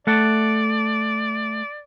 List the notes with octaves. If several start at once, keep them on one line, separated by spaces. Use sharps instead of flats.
A3 D5 F#5 A5